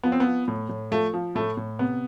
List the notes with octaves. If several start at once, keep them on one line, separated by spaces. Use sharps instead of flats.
F3 B3
C4
B3
F3
A2
A2
F3 A3
F3
A2 A3
A2
C3 B3